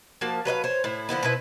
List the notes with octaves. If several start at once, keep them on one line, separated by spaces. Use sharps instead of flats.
F3 A#3 F#4 A5
F#3 B4 D#5 F5
C5 C#5
A2 E4
D3 F3 B3 E4
B2 C4 E4 B4